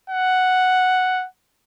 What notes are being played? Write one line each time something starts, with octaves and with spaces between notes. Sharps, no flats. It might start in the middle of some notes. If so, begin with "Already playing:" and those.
F#5